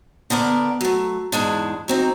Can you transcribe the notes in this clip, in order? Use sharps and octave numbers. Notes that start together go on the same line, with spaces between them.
D3 B3 A#4 D5
F#3 A3
E2 G#2 G#3 D4
F#3 C4 D#4